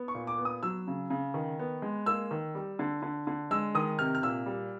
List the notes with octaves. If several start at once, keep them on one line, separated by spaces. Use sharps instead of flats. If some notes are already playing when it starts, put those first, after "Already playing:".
Already playing: B3
C#6
A#2
D6
B3
D#6
F#3 E6
C#3
C#3
D#3
B3
G#3
A#3 E6
D#3
G3
D3
D3
D3
G#3 E6
D#3 D#6
C3 F6
F6
A#2 E6
G3